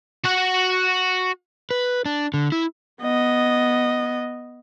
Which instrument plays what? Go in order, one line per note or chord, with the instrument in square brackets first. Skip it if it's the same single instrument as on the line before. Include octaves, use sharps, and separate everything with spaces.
[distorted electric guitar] F#4 F#5
[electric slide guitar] B4
D4
D3
E4
[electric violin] B3 D#5